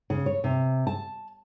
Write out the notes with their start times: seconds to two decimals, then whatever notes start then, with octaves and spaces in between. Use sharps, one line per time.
0.10 C#3
0.26 C#5
0.44 C3
0.87 A5